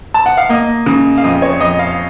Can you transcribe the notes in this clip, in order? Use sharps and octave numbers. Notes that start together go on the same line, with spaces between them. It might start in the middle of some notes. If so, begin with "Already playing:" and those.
A5
F#5
F5
A#3 D#5
C#3
F5
F2 D#5
C#5
F2 D#5
F5